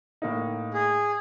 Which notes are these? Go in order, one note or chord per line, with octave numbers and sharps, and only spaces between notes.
A2 A#3 D#4
G#4